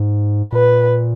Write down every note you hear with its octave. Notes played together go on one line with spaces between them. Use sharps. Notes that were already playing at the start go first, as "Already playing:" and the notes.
Already playing: G#2
A#2 B4